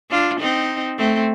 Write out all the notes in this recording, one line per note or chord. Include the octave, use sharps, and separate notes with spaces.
D4 F4
C4 D#4
A3 C4